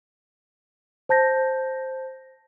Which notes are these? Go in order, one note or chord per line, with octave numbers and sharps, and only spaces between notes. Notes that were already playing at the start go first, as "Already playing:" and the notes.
C5 A5 G6 A#6